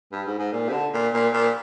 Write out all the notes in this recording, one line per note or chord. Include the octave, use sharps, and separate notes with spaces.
G2
G#2
G#2
A#2
C3
D3
A#2
A#2
A#2